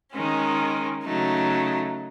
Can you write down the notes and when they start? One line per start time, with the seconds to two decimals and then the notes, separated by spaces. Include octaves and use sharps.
0.12 D#3 G#3 C#4
1.04 C#3 F#3 A3 D#4